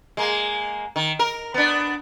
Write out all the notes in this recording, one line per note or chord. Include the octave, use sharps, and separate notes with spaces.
G#3 A#3
D#3
A#4
B3 D4